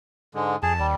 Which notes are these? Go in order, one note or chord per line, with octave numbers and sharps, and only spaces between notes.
G#2 D3 G#3
F2 G#4 A5
D#2 G3